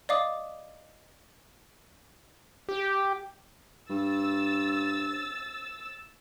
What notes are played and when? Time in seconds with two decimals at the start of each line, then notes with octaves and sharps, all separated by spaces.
0.09 D5 D#5 F5 D6 D#6
2.69 G4
3.90 G2 E6 A6